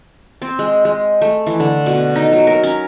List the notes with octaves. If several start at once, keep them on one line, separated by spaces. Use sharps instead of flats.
C4
G#3
G#3
A3
E3
D3
B2
D#4
F#3
A#4
C#4